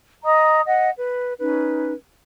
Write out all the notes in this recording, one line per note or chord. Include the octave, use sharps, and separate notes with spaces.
D#5 A#5 D#6
D#5 F#5
B4
C#4 D#4 B4